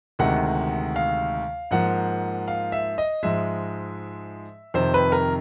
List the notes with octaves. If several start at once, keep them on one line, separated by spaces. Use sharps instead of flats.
D2 C3 D#3 G#3 F#5
F5
G#2 F3 A#3 F#5
F5
E5
D#5
G#2 F3 G#3 E5
F2 C3 D#3 C5
B4
A#4